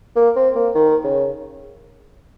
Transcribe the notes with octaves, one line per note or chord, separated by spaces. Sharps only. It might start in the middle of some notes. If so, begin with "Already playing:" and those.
A#3
C4
A#3
D#3
C#3